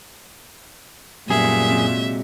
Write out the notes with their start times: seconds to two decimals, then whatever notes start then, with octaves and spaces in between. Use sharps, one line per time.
1.30 F#2 A#2 G3 B3 G#4 E5
1.70 C3 F#3 G#3